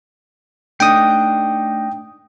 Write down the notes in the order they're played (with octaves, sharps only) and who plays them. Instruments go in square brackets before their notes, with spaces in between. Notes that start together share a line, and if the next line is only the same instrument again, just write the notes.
[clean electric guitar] A3 D4 D#4 [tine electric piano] G5 D#6